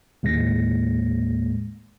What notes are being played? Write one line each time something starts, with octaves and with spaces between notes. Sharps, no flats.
D#2 A2 G#3 A#3 A#6